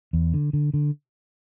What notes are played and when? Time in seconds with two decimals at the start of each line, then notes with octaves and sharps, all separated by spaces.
0.13 E2
0.34 D3
0.53 D3
0.74 D3